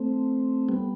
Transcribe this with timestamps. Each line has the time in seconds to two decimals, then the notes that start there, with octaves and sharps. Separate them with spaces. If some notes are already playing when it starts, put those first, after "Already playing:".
Already playing: A3 C4
0.69 G3 B3